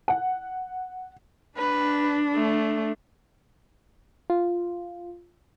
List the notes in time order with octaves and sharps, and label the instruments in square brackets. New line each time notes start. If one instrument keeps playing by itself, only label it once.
[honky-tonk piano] F#5
[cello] D4 [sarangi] B4
[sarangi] A3
[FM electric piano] F4